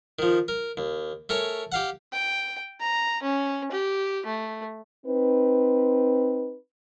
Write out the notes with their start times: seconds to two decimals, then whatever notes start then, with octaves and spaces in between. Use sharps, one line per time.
0.19 D#3 F3
0.48 A#4
0.77 D#2
1.29 A3 A#4 C#5 G#5 C#6
1.72 G4 F5 F#5
2.13 G5
2.81 A#5
3.22 C#4
3.71 G4
4.26 A3
5.06 C4 D#4 B4